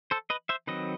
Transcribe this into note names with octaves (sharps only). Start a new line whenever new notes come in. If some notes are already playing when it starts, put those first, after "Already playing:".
A4 C5
B4 D#5
C5 E5
D#3 F#3 C4 B4 D#5